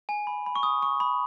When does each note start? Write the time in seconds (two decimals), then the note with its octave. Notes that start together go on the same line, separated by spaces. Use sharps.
0.09 G#5
0.27 B5
0.46 B5
0.55 C#6
0.63 D#6
0.82 C#6
1.00 B5